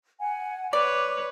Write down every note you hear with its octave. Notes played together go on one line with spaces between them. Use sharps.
F#5 G#5
B4 C#5 D5 D6